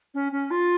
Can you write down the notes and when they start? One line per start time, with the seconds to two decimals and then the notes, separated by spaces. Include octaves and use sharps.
0.14 C#4
0.32 C#4
0.50 F4